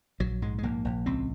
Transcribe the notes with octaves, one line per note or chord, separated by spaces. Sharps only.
A#1 F#3
G#2 G#3
G#3
A#1 A#3
A#1
C#2 C4